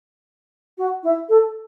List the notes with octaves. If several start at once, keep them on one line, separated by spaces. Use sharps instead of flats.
F#4
E4
A4